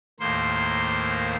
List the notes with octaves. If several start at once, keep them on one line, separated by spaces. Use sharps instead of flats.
D#2 A2 A#3 C5 C6